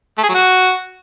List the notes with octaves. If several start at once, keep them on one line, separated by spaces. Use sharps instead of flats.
A3
G#4
F#3
F#4